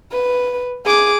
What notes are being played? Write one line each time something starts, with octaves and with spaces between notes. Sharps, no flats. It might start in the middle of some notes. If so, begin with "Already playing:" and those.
B4
G#4 D6